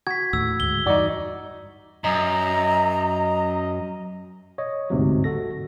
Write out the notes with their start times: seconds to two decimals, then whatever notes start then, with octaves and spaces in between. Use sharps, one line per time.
0.07 F#4 G#6 B6
0.33 D#2 A2 E6
0.60 D2 G#2 G7
0.86 E2 G2 D#4 F#4 D5
2.04 F#2 D#5 A#5
4.58 C#5 D#5
4.90 G1 D2 G#2 C3 F#3
5.24 F#4 A4 A#6